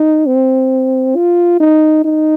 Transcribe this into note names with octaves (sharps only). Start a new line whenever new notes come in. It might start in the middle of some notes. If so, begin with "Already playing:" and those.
Already playing: D#4
C4
F4
D#4
D#4